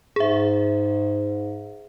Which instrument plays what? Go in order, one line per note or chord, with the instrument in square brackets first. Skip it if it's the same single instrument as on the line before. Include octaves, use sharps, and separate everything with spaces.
[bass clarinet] G#2 [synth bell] G#4 E5